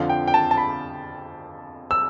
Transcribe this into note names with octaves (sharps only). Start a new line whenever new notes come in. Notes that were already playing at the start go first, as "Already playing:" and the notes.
Already playing: F2 D3 F3 F5
G5
G5
A5
A5
B5
E6